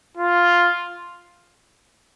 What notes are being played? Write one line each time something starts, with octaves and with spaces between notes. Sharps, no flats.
F4